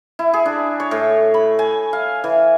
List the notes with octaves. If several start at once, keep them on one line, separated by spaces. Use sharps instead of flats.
E4
G#4
D4
C#5
A2
B5
G#5
F5
E3